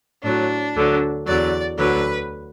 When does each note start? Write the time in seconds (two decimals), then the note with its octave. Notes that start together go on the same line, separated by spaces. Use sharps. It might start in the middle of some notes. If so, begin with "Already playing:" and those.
0.24 A2 F#3 D4
0.75 D2 D3 F#3
1.27 E2 D3 F#3 D5
1.78 D2 D3 F#3 B4